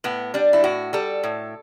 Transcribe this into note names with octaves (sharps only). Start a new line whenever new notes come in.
A2 B3
G3 D4
E4
A2 F#4
G3 A4
A2